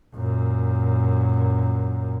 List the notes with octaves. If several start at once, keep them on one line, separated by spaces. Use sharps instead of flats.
F#2 A#2